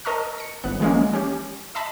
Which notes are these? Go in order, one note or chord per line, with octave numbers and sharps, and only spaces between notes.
A#4 D#5 A5 A#5 C#6 F6
A#6 C#7
G1 B3 F#6
E3 F3 G#3 A#3 C#4
C#4 G4
D#5 E5 A5 B5